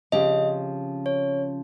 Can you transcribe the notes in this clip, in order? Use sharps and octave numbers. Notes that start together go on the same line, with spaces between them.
C#3 F3 C4 G4 D#5
C#5